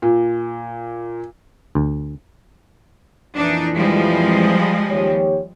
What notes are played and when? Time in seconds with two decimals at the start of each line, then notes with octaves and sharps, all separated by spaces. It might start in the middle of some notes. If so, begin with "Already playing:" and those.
0.02 A#2
1.75 D2
3.36 F2 A#2 E3 D4 D#4
3.76 F3 G3 G#3
4.89 D#2 G4 C#5